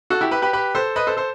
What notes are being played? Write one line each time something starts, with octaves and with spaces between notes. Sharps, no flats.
F#4 A4
E4 G4
G4 B4
G4 B4
G4 B4
A4 C5
B4 D#5
A4 C5
A4 C5